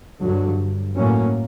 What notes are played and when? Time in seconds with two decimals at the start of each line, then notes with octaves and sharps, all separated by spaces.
0.23 G2 D3 F#3
0.98 A2 F#3 A#3 C#4